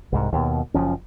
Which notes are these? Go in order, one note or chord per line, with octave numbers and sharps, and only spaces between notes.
C2 G#2
D#2 B2
F#1 F3 C#4